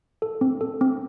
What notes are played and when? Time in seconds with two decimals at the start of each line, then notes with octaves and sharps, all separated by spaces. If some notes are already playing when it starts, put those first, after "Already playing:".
0.22 A4
0.41 C4
0.61 A4
0.81 C4